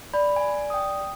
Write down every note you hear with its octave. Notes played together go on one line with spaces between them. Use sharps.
D5 B5
G#5
G5 D#6